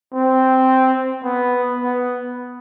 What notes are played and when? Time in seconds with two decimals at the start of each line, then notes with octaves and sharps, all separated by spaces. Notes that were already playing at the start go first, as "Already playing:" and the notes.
0.14 C4
1.23 B3
1.79 B3